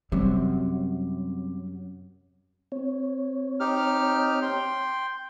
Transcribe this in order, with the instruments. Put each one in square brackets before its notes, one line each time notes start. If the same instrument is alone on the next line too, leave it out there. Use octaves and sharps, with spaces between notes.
[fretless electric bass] F#2 [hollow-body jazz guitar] C3 [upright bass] G3
[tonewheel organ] C4 C#5
[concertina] D#4 G4 F6
G5 C6